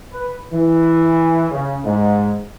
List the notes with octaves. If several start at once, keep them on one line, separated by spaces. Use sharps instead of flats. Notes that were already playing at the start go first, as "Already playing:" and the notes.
B4
E3
C#3
G#2